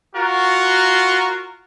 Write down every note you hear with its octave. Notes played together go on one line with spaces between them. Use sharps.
F4 F#4 A#4